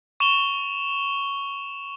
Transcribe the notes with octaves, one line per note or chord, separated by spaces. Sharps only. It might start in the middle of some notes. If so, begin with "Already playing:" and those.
C#6 E7 F7 G7